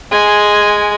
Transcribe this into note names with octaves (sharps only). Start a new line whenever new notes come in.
G#3 G#5